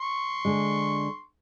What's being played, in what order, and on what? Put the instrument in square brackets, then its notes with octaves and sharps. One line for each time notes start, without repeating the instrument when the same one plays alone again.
[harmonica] C6 C#6
[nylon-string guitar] D3 G#3